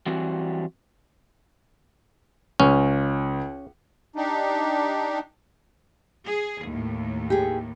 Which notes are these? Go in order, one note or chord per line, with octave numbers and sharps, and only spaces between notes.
E3 F#3 G3 C4 F#4
C#2 C#4
D4 D#4 G4
G#4
D#2 A2
G4 G#4